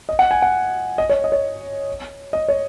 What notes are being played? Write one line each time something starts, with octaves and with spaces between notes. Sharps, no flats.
D#5
F#5
G#5
F#5
D#5
C#5
D#5
C#5
D#5
C#5